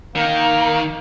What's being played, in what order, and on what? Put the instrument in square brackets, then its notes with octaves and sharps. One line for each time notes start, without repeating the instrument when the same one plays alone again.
[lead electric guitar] D#3 [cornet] A#3